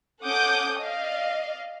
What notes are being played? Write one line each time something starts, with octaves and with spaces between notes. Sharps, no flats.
C#4 A4 F#5 D6 D#6 G6
D5 D#5 F5